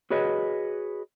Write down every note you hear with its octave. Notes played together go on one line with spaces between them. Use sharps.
F#4 G#4 B4 C#5 D#5